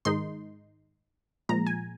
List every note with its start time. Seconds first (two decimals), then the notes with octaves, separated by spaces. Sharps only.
0.05 G#2 D#3 G#3 D#4 C6
1.49 A#2 F3 G#3 A#5
1.66 G#5